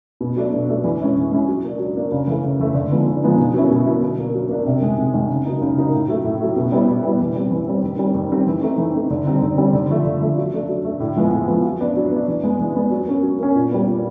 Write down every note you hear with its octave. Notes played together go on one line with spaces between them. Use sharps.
B2
F#3 A3 D4
B2
F#3 A3 D4
E3
G#3 C#4 E4
E3
G#3 C#4 E4
F#3
A#3 D4
F#3
A#3 D4
C#3
E3 A3
C#3
E3 A3
D3
F3 G#3 B3 D#4
D3
F3 G#3 B3 D#4
B2
F#3 A#3 C#4 E4
B2
F#3 A#3 C#4 E4
F#3
A#3 D4
F#3
A#3 D4
C3
D#3 G#3
C3
D#3 G#3
C#3
F#3 A#3 D#4
C#3
F#3 A#3 D#4
A2
F#3 A3
A2
F#3 A3
B2
G3 B3 E4
B2
G3 B3 E4
E3
G3 C4
E3
G3 C4
D#3
G3 C4
D#3
G3 C4
E3
A3 C4 D#4
E3
A3 C4 D#4
D3
G3 C4 D#4
D3
G3 C4 D#4
D3
F3 A3
D3
F3 A3
F#3
A3 D4
F#3
A3 D4
A2
F3 G#3 B3
A2
F3 G#3 B3
F#3
B3 D4
F#3
B3 D4
E3
G#3 B3 D4
E3
G#3 B3 D4
F#3
A#3 C#4
F#3
A#3 C#4
A#2
G3 B3
A#2